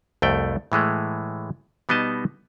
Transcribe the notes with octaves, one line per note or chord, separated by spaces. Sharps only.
C2 F2 A3 G5
A2 E3 G#3 A3
B2 G3 B3 D#4 D#5 A5